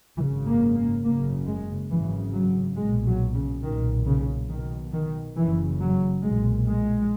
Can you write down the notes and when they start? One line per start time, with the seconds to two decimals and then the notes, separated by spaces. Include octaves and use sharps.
0.17 G#1 F#2 C#3 E3
0.46 A#3
0.75 A#3
1.04 F#1 F#2 C#3 A#3
1.47 G#3
1.90 G#1 F#2 C#3 E3
2.33 F#3
2.76 B1 A#2 G#3
3.06 F#3
3.34 C#3
3.63 B1 A#2 D#3
4.06 C#3
4.49 B1 B2 D#3
4.92 D#3
5.36 F#1 F#2 C#3 E3
5.80 F#3
6.22 B1 A#2 G#3
6.66 G#3